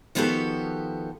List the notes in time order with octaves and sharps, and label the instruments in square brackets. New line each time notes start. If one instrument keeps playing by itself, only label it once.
[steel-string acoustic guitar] D#3 F3 B3 F#4 G4 A4